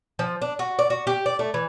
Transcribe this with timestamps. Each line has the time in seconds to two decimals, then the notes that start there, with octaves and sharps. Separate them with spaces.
0.19 F3
0.42 D4
0.59 F#4
0.79 D5
0.90 F#4
1.07 G4
1.26 D5
1.39 A3
1.54 E3